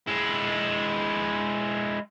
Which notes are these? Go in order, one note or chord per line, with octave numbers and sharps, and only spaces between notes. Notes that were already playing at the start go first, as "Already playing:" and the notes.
G#3 E4